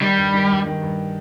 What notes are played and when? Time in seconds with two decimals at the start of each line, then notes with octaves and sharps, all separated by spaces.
0.02 D#3 G3
0.18 G2
0.34 D#3
0.50 G2
0.66 D#3
0.82 G2